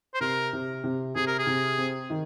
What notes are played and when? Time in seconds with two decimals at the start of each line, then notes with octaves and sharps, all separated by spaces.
0.14 C5
0.21 C3 A#4
0.53 C3
0.84 C3
1.15 C3 G#4
1.27 A#4
1.39 G#4
1.47 C3
1.78 C4
2.10 D#3